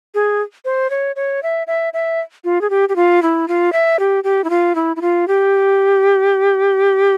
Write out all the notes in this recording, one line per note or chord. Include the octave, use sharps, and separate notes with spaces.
G#4
C5
C#5
C#5
E5
E5
E5
F4
G#4
G4
G4
F4
E4
F4
E5
G4
G4
E4
F4
E4
E4
F4
G4